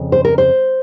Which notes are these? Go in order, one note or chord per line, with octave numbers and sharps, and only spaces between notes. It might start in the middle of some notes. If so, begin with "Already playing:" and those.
Already playing: F2 C#3
C5
A#4
C5